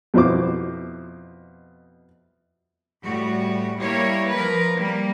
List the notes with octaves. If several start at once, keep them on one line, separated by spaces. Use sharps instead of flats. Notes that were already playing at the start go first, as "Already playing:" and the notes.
F2 B2 E4 C5 D6
A2 G3 F#4
G3 A#3 E4 C#5
F3 A#4 B4
G3 A#3